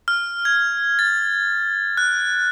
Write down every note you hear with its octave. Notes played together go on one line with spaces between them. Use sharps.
F6
G#6
A6
F#6